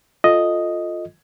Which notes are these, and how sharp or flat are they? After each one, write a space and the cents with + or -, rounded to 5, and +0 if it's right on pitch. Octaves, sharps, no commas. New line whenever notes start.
F4 +5 A4 +0 D#5 +0